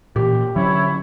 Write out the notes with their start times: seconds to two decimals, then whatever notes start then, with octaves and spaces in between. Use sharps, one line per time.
0.16 A#2 E3 G4
0.56 D3 F#3 C#4 E4 C#5